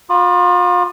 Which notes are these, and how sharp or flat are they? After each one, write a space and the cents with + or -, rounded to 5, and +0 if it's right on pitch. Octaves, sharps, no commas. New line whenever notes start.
F4 +35 B5 +0 D6 +45